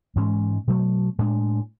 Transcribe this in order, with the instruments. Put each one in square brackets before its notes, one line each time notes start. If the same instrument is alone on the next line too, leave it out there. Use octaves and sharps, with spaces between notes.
[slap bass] G#2 E3 G#3 C#4
B2 F#3 A3
A2 G#3 D4